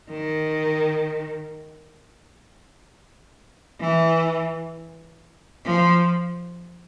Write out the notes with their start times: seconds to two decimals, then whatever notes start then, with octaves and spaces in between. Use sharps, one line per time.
0.11 D#3
3.80 E3
5.65 F3